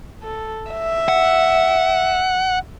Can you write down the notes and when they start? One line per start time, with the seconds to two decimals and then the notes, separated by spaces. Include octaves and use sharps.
0.23 A4
0.71 E5
1.08 F#5